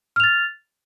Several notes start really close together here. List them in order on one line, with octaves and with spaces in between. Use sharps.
F6 F7 A6